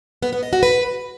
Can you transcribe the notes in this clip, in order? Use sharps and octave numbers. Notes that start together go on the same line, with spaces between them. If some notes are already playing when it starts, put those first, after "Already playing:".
B3
B3
D#5
F#4
B4